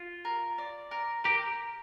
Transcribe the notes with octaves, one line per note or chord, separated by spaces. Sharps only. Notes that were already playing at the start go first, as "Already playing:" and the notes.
Already playing: F4
A#4
D5
A#4
G4 A#4